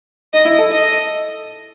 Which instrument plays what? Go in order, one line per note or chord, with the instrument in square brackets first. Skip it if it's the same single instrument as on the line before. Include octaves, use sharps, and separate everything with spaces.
[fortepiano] D#4 [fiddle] D#5
[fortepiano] E4
A4
[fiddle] D#5